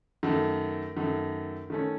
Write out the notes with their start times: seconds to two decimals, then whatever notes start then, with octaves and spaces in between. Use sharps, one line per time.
0.23 F#2 D#3 A3
0.97 F#2 D#3 A3
1.70 D#3 A3 C#4